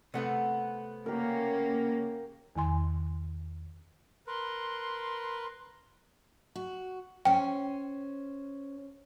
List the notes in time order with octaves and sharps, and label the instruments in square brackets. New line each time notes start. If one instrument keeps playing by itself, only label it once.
[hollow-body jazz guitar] C3 A3 B3 [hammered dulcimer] F#5
[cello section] C#3 A#3 C#4 [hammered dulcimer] G4 A#4
[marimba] E2 D#3 G#5 C6
[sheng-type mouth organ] A#4 B4 [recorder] C6
[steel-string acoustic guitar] F#4
[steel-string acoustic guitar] C#4 C5 [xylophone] G5